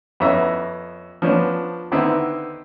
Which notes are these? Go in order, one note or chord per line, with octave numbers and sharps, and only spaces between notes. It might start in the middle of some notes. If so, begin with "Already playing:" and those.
F2 B3 C#4 E4 E5 A#5
F3 B3 C#4 D4
D3 D#3 B3 C4 E4